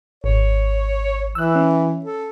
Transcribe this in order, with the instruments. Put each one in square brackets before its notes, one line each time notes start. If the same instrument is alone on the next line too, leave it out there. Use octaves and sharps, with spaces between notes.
[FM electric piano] G#1 [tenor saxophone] C#5
[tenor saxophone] E3 [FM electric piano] E6 F#6
[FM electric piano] C#4
[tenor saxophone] A4